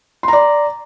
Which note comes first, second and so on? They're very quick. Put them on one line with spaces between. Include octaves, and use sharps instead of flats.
C6 A#5 D5